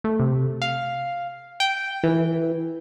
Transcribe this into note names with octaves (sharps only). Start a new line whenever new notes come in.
A3
C3
F5
G5
E3